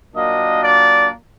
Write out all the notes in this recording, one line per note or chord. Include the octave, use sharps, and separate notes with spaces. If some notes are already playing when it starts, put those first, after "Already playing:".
A#2 F#3 A#3 D4 D#5
D5